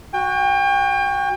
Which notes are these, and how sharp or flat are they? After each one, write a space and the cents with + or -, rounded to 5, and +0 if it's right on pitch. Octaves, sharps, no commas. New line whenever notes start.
F#4 +0 G5 +35